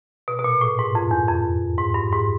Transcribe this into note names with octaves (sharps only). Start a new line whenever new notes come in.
B2
B2
A#2
A2
G#2
F2
E2
F2
G#2
G2
G#2